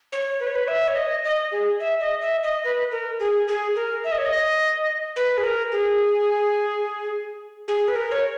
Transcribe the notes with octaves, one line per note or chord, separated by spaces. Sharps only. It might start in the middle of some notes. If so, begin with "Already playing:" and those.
C#5
B4
C#5
B4
E5
C#5
D#5
D#5
G#4
E5
D#5
E5
D#5
B4
A#4
G#4
G#4
A#4
E5
D#5
C#5
D#5
B4
G#4
A#4
G#4
G#4
B4
A#4
C#5